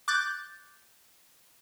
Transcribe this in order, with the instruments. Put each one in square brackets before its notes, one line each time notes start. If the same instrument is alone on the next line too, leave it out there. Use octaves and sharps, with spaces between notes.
[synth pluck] D6 F#6 G6 A6